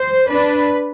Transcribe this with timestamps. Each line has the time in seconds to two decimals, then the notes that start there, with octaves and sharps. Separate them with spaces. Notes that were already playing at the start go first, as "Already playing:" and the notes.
Already playing: C5
0.29 D4 B4